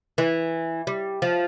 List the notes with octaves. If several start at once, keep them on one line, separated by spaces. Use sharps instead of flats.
E3
G3
F3